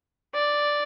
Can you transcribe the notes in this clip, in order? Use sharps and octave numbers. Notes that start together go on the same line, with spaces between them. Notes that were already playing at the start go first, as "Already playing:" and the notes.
D5